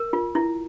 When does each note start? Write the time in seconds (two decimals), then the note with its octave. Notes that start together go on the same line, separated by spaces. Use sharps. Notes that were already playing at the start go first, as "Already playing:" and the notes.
Already playing: A#4
0.13 F4
0.35 E4